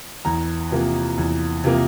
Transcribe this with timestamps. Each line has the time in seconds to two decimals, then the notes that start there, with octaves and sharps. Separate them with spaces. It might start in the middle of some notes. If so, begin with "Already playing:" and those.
0.25 E2 A#5
0.71 C3 F3 A#3
1.18 E2
1.64 C3 F3 A#3